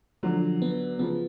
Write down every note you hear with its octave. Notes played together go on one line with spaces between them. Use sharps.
D3 F3 F#3
B3
C#3 F3 B3